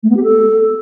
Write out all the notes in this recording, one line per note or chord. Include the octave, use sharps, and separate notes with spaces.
A3
B3
G4
A4